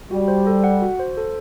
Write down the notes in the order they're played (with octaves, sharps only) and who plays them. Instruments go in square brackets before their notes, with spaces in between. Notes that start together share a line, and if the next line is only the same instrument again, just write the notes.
[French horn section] G3 [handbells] F#4
[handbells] C5
A4
F#5
F#4
C5
A4